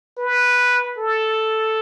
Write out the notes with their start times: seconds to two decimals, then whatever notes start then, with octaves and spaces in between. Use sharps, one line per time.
0.18 B4
0.98 A4